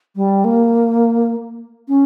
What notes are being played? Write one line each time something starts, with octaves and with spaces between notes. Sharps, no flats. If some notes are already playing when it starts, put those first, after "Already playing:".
G3
A#3
C#4